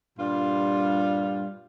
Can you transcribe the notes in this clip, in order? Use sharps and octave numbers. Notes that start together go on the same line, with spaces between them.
G2 A#2 G3 F4